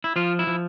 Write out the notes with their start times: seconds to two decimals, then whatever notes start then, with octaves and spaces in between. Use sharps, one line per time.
0.04 E4
0.16 F3 F4
0.39 E4
0.47 F3